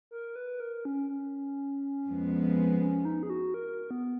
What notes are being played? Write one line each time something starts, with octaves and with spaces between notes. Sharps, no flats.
A#4
B4
A#4
C#4
C#4
F2 F3 G#3 B3
C#4
D#4
G#4
F#4
A#4
B3